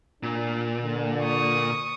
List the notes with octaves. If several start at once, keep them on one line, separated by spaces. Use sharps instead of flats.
A#2 D4
D3
C#6 D#6